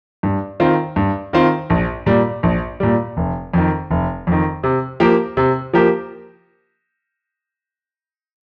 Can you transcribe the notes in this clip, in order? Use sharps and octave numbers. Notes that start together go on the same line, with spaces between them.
G2
D#3 C4 F4
G2
D#3 C4 F4
A#1
A#2 G3
A#1
A#2 G3
F1
F2 D#3
F1
F2 D#3
C3
F3 A#3 G4 A#4
C3
F3 A#3 G4 A#4